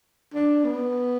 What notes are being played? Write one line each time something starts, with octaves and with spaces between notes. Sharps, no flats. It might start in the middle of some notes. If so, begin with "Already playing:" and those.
D4
B3